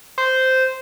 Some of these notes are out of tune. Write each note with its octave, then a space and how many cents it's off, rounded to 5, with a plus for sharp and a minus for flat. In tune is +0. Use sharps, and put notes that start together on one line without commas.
C5 -10